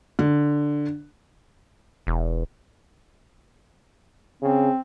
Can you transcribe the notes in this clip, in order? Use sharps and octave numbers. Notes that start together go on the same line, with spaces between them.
D3
E1
C#3 C4